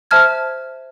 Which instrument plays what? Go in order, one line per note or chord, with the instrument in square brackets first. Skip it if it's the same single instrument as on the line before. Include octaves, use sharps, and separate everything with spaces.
[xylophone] C5 E5 A5 F6 G#6